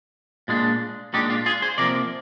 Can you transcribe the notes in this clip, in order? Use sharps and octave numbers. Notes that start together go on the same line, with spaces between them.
A#2 G#3 D4
A#2 G#3 D4 D#4 G4
D4 F4
F4 G#4
G#4 C5
C3 F3 A#3 A#4 D5